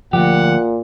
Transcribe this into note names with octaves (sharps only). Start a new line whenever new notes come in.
D2 A#2 F3 G4 F#5